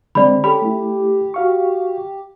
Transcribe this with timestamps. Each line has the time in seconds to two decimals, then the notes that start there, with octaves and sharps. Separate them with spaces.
0.15 D3 G#3 C4 D5 B5
0.44 C#4 G4 A4 B5
0.62 A3 E4
1.34 F#4 F5 C#6